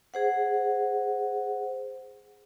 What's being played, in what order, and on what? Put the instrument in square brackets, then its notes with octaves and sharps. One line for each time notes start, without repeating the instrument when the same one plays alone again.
[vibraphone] G#4 C5 F#5